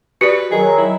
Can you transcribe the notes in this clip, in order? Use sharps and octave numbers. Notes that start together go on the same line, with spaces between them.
F#4 G4 B4 D5
D#3 F#3 G#4
E4